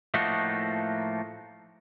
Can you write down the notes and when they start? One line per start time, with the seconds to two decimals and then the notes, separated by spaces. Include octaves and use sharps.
0.14 A2 F3 A3 A#3 D#4 F#4